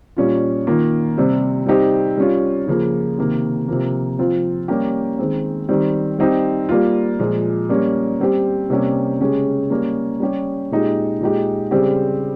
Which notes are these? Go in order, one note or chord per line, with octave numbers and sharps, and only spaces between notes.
A#2 G3 C#4 F4
D#3 A#3 F4
C3 G3 C4
G3 C4 D#4 G4
G3 C#4 F4
C#3 F3 A#3
C3 D#3 A#3
C3 F3 A#3
F3 C4 F4
G3 A#3 C#4 G4
D#3 G#3 C4
D#3 G3 C4
G3 C4 D#4 G4
G3 A#3 F4
A#2 F3 G#3
G3 A#3 C#4
G3 C4 G4
C3 G3 A#3 C#4 G4
C#3 G#3 C#4 G4
G3 A#3 C#4
G3 C#4 G4
A#2 G#3 D#4 G4
A#2 G#3 D#4 G4
C#3 G3 C4 G4